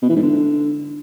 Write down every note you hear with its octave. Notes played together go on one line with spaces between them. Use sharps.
B2
E3
G#2
D3